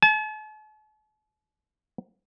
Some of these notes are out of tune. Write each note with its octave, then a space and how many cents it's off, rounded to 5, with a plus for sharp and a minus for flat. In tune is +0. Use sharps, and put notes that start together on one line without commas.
A5 -45